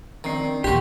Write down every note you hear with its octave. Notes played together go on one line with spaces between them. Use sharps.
D#3 C4 D4 C7
A#1 D#2 F#4 G4 C6